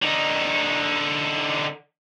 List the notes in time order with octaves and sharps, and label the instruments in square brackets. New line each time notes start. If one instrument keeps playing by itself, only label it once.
[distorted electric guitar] D3 D#4